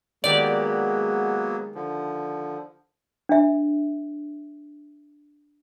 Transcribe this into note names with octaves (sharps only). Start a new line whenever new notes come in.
D#3 F#3 G#3 A#3 B3 G4 D5
D3 F3
D4 E5